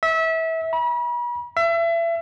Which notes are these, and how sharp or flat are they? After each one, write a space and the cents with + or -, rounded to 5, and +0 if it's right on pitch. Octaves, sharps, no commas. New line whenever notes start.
E5 -25
B5 -40
E5 +30